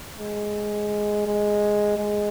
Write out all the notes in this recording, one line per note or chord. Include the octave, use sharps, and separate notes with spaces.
G#3
G#3
G#3